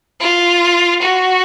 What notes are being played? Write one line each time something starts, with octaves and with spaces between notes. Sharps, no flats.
F4
F#4